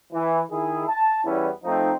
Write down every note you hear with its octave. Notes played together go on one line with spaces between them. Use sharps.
E3
D#3 E4 G#4
A5
E2 E3 G3 B3 C#4 E4
F3 A3 C4 D#4